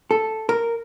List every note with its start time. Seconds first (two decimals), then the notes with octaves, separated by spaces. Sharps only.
0.11 A4
0.49 A#4